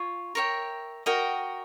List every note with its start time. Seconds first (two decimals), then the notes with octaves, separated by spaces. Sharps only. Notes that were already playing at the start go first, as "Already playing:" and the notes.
Already playing: F4 C#5
0.35 A#4 C#5 E5 G5
1.06 F#4 A#4 D#5 G5